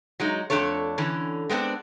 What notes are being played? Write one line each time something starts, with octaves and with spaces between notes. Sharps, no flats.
F#3 G#3 D#4
F2 A3 D4 A4 C#5
D3 E3 C#4
G#3 B3 C4 D4